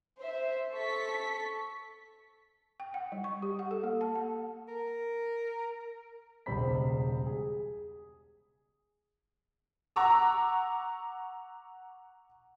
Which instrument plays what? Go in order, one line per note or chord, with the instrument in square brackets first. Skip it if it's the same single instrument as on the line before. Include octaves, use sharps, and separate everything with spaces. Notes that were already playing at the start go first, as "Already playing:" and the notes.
[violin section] C5 E5
A4 C#6 B6
[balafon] G5
F#5
G3
C#6
G4
F#5
A4
A#3
A5
F#5
[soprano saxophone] A#4
[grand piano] E1 C#2 G3 C5 B5 B6
G#4
[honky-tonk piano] F#5 A#5 C#6 D6 E6